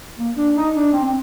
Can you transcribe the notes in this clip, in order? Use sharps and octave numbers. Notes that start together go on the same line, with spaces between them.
A#3
D4
D#4
D4
C4
C4